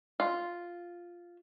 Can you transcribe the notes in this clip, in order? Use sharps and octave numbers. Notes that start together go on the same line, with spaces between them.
F4